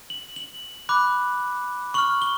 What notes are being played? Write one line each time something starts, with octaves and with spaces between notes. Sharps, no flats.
F#7
F#7
B5 D6 F#6
C#6 F6 F#7
G7